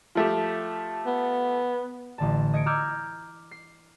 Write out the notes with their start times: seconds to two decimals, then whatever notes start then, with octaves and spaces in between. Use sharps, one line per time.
0.15 F3 A3 G4
1.06 B3
2.18 A1 D3 A5
2.53 D#5 G#6 C#7 D7
2.66 A#5 D6 E6 F6 G6 G#6
3.51 C7